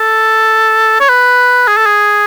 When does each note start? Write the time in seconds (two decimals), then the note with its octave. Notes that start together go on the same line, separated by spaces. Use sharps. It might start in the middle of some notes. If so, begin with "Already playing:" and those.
Already playing: A4
1.01 C#5
1.09 B4
1.68 G#4
1.77 A4
1.86 G#4